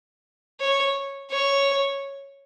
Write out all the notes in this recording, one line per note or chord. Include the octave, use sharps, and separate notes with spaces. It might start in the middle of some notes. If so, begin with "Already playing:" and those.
C#5
C#5